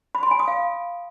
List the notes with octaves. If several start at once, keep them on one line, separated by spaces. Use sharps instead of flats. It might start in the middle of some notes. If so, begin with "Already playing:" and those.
B5
C6
G#5
D#6
F5